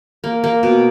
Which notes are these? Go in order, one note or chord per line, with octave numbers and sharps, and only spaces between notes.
A#3
A#3
B2